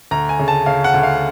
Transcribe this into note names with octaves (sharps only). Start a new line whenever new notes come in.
D2 A#5
G#5
C#3
A5
C#3 F5
F#5
D2
F5